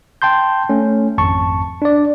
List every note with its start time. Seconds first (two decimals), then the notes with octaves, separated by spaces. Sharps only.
0.22 G5 A5 C6 G6
0.69 A3 C#4
1.18 G#1 F2 A5 C#6
1.82 D4 D5